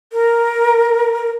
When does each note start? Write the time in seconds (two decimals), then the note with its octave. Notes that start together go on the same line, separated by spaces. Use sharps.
0.12 A#4